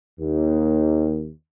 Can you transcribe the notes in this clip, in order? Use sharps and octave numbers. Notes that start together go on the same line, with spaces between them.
D#2